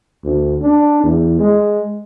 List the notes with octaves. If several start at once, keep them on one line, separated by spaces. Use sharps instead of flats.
D2
D4
E2
G#3